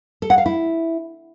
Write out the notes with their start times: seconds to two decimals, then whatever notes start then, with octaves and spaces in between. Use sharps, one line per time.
0.22 A4
0.30 F#5
0.38 F5
0.46 E4